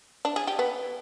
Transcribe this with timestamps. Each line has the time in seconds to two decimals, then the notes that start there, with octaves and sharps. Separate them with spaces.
0.25 D4
0.36 G#4
0.47 G4
0.59 B3